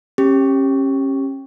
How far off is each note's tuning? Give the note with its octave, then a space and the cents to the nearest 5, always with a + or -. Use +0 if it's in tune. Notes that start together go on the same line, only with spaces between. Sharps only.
C#4 -30 G4 +5